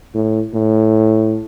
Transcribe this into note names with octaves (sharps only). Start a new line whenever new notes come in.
A2
A2